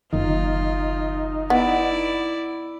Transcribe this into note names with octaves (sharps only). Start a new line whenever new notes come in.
F#1 D#3 D#4 F4
B3 E4 D5